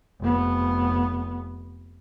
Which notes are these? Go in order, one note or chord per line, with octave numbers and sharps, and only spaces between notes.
F1 B3